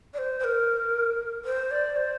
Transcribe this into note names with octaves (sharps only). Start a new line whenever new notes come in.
D5
C5
C5
A#4
C5
D5
C5